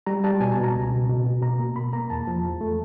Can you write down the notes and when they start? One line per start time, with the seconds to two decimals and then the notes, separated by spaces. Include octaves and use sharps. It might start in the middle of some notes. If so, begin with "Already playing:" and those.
0.06 G3 A#5
0.24 G3 A5
0.40 B2 G#5
0.52 A5
0.57 B2
0.64 A#5
0.75 C#2
0.92 B2
1.09 B2
1.26 B2
1.42 B2 A#5
1.59 A#3
1.76 B2 B5
1.93 A#3 A#5
2.10 E2 A5
2.27 F3
2.44 E2
2.61 A3